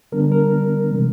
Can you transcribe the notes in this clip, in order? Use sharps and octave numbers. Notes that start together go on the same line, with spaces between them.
D3 G3 B3 D4 A#4
A#4
C3 E3 G#3 C4